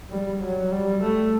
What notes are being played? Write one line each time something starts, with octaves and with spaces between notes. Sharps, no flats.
G3
F#3
G3
A3